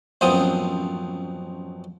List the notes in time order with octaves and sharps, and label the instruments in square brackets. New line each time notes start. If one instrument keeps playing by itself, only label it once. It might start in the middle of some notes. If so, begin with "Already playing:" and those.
[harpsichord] A1 F#2 F3 B3 C4 D#6